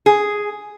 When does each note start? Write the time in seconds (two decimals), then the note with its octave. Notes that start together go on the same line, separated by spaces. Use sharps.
0.06 G#4